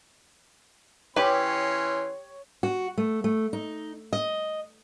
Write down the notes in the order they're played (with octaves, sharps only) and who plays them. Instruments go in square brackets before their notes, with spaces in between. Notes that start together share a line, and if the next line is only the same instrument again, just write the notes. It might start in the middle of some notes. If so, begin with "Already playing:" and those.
[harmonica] E3 C#4 C6 [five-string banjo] G4 B4 [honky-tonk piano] C#5
[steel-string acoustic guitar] F#4
A3
A3
D#4
D#5